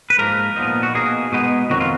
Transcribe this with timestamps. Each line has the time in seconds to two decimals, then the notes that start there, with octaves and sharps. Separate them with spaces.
0.10 B4
0.18 G#2 F3 A#3 A#4
0.56 A#2 F3 B3 D#4
0.83 F#4
0.95 B2 A#3 D#4 G#4
1.32 B2 G#3 B3 D#4
1.70 F2 D#3 F#3 F#4
1.80 F4